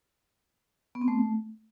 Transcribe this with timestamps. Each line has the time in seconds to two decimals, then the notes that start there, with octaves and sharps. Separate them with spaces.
0.95 B3
1.01 C4
1.08 A3